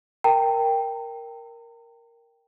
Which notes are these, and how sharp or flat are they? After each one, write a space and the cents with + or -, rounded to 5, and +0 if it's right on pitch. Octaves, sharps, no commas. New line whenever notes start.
A#4 +0 G5 +0 A#5 -40